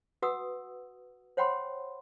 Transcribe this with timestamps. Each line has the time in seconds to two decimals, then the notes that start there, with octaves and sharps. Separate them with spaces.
0.22 F#4 B4 F#5 D#6 E6
1.37 C5 C#5 F#5 G5 B5 C6